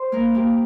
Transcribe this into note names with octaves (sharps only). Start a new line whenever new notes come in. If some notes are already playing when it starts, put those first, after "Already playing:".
Already playing: C5
A#3 A#4
A#3 G4